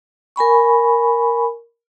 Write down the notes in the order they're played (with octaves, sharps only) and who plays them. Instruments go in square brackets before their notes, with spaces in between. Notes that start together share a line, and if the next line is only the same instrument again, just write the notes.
[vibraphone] A#4 G#5 B5 C#6